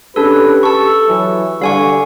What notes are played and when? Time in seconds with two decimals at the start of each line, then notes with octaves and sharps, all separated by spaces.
0.16 C#4 D4 G4 A4 B4
0.63 A4 C#6 E6
1.09 E3 F#3
1.62 D3 G3 F5 G#5 C#6